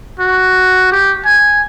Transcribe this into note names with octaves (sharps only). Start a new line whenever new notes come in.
F#4
G4
G#5